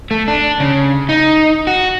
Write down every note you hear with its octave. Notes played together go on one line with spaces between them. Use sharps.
A3
D4
C#3
D#4
F#4